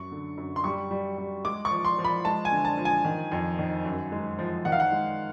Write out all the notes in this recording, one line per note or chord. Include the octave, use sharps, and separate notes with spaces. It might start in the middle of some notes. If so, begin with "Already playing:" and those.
Already playing: F#2 C#6
D3
F#2
C6
G3 C#6
G3
G3
G#3 D6
C#6
F3
C6
F3
B5
G#3 A5
G#5
D3
A5
F3
G#5
D#3
F2
D#3
F#2
G#3
F3
D#3 F#5
F5
F#5
G#3